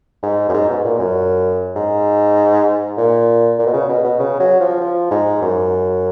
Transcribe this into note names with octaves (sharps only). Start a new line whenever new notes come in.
G#2
F#2
G#2
B2
A#2
F#2
G#2
A#2
A#2
B2
C#3
B2
B2
C#3
F#3
F3
F3
G#2
F#2